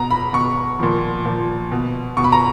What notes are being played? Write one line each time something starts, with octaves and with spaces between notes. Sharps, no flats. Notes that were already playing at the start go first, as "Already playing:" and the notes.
Already playing: B2 A#5
B5
B2 C#6
A#2 F3
A#2 F3
B2
B2 C#6
B5
A#5